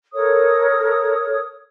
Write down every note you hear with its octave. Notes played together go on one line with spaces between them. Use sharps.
A4 A#4 C#5 D#6